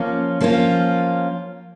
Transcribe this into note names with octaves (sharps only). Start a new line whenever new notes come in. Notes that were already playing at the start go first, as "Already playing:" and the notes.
Already playing: F3 A#3 C#4 F4
F3 A#3 C#4 F4